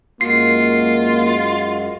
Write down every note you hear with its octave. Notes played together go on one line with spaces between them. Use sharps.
F#2 G#3 A#3 F4 F#4 C7